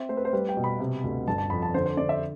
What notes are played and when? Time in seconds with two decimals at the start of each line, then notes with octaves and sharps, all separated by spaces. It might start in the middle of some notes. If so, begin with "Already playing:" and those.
Already playing: C4 E5
0.09 A3 C5
0.17 B4
0.25 C5
0.33 G3 B4
0.49 G5
0.57 B2
0.64 B5
0.79 C3
1.04 D2
1.28 G1 A5
1.38 A5
1.50 F2 B5
1.62 A5
1.74 D3 C5
1.86 C5
1.97 D3 D5
2.09 E5